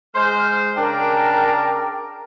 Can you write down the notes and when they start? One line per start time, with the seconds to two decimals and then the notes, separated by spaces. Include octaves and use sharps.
0.15 G#3 C5 F6
0.77 C#3 D4 A#4 G5